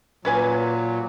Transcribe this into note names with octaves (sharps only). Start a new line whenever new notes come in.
A#2 F#3 C#4 B4 G#5